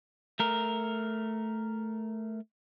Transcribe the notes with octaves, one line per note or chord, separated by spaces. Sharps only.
A3 A#4